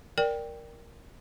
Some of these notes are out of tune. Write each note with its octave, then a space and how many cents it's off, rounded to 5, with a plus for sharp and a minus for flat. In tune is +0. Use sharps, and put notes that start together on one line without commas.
A#4 +0 D5 +0 G5 +5